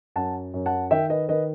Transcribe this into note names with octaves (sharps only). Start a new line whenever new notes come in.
F#2 F#5 A5
F#2
F#5 A5
D#3 E5 G5
B4 D#5
D#3 B4 D#5